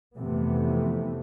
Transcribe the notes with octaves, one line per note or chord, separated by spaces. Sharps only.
F2 C3 E3 A3 B3